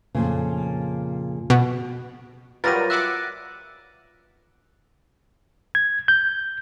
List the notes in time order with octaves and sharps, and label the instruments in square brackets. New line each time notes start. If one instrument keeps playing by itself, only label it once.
[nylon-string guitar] F2 A#2 C#3
[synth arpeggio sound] B2
[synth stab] F#3 G3 A#4 [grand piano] F4 B4 [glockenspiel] A6 A#6 D#7
[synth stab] E5 F#5 D6 [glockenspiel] F#6
[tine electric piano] G#6
G6